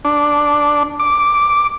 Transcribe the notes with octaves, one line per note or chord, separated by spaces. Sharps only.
D4
D6